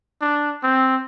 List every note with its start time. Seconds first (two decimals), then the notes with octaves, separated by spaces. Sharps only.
0.22 D4
0.64 C4